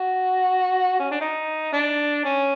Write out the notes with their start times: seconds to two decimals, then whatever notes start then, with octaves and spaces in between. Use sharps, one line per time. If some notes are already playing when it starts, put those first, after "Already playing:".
Already playing: F#4
1.00 C#4
1.11 D4
1.21 D#4
1.73 D4
2.25 C#4